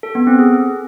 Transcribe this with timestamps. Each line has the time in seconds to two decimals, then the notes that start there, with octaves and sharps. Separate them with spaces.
0.03 A4
0.15 B3
0.27 C4
0.39 G#4